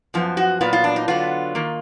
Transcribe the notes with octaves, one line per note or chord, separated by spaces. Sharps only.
F#2 F3 B3
F#4
A#2 F#3 B3 F4
F4
D4
D#4
D3 F#3 B3 F4
D#3 A#3